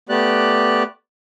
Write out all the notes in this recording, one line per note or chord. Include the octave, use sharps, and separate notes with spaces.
A3 B3 G4 D5 F#6